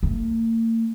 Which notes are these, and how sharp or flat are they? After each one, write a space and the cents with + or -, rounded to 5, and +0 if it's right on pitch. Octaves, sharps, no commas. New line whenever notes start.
A#3 -45